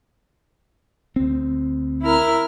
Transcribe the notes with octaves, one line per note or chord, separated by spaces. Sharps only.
D2 C4
E4 A#4 F6